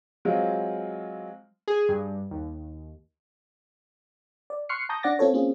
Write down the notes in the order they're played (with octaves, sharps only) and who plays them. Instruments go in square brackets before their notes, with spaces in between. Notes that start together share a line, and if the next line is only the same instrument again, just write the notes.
[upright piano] F#3 G#3 C4 F4
[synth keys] G#4
G2
D#2
[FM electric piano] D5
C6 C#6 F6 F#6 C7 C#7
A5 A#5 C#6 D#6 G6 A#6
D4 D5 F#5 D6 A6 A#6
C4 F4 A4 C#5
A#3 C4 C#4 F4 G#4